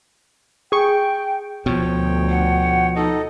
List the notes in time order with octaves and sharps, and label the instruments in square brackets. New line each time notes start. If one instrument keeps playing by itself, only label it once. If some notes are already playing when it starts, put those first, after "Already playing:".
[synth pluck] G#4 C#6 [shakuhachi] G5
[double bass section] D2 [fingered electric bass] B2 F3 [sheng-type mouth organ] C#5 G5
[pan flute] F#5
[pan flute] D#4 [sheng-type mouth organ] A4 D#5